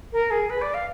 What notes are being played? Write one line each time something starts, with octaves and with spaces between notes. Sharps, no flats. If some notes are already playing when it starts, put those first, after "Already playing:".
A#4
G#4
B4
D5
F5